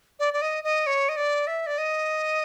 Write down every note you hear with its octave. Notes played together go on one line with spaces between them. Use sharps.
D5
D5
D#5
D#5
C#5
D#5
D5
E5
D5
D#5